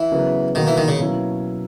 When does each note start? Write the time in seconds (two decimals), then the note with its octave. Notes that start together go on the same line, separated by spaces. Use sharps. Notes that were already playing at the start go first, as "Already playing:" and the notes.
Already playing: E3
0.12 C#3 F#3 B3 F#4 A#4
0.55 B2 D#3 A#3 D#4 F#4
0.67 E3
0.77 D#3
0.88 C#3
0.99 B2 F#3 A#3 C#4 E4